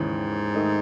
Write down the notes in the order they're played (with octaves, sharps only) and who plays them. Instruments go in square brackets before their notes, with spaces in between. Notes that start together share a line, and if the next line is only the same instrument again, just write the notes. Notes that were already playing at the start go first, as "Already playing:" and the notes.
Already playing: [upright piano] D#2 C#3 E3 [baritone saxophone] G#2
[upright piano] D#3 A3 D#4